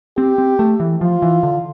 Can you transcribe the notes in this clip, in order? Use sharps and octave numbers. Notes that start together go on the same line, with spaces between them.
C4 G4
C4
A3
E3
F3 F4
E3
D3